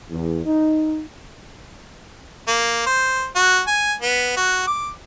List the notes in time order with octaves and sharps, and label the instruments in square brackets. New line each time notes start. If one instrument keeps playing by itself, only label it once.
[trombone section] E2
D#4
[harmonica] A#3
C5
F#4
G#5
B3
F#4
D6